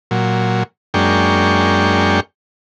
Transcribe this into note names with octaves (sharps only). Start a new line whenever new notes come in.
A#2 F#3
F#2 G#3 A#3 D4 G5 C#6